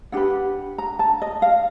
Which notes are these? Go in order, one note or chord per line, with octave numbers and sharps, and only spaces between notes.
D4 G4 B4 F#5
A#5
A5
D#5
F5